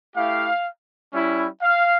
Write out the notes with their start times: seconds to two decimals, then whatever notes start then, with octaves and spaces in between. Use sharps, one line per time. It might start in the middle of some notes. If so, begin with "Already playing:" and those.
0.15 A3 E4 G4 F5
1.13 G3 C#4 E4
1.62 F5